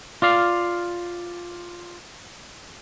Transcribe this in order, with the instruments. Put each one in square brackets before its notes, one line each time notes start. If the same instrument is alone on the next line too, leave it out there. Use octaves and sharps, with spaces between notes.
[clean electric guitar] F4 D5 F5